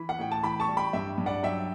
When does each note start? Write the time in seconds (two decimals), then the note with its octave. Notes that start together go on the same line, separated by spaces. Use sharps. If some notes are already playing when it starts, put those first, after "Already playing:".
Already playing: E3 B5
0.09 F#5
0.19 A2 G5
0.32 A5
0.43 E3 G5 B5
0.60 A5 C#6
0.68 G3
0.77 G5 B5
0.93 G2 E5 G5
1.18 G2
1.26 D5 F#5
1.43 F#3 E5 G5